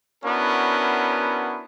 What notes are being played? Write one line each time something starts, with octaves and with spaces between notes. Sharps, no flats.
B3 C#4 D4 E4 F#4 A#4